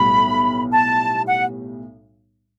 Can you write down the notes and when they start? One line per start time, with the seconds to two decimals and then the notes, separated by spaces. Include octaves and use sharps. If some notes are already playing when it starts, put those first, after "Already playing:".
Already playing: B1 A2 G3 B3 B5
0.72 A5
1.27 F#5